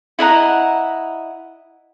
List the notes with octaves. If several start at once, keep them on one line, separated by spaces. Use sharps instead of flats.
E4 D#5 F#5 A#5